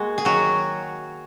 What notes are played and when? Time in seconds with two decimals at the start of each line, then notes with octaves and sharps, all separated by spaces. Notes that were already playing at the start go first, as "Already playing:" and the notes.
Already playing: G#3 A#3 F#4
0.18 G#4
0.25 D#3 F#3 F#4